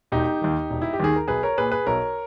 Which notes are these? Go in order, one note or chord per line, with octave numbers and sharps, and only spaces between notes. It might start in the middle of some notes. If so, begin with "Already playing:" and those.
E1 D#4 G4
D#2 D#3
E1
E4
G4
D#2 D#3 G#4
A#4
B1 G#4 B4
A#4 C#5
A#2 G#4 B4
G#4 B4
B1 A#4 C#5